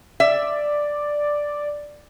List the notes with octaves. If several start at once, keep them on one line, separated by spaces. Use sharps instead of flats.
D5 E5